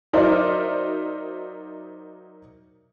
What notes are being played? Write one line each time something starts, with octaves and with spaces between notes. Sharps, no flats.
F#3 D#4 A#4 C5 D5 E5